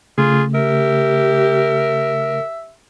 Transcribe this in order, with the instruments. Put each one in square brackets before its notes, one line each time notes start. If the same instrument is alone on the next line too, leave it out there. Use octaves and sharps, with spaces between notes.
[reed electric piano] C#3 A3 [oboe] F4 [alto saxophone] G#4
[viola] G4 [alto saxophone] A#4 [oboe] E5